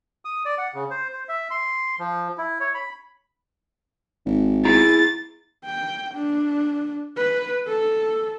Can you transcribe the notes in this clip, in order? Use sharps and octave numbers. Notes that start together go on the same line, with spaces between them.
D#6
D5
F#5
C#3
C5
C5
E5
C6
F3
E4
C#5
B5
G#1
E4 G#4 A#5 A6
G5
D4
B4
A4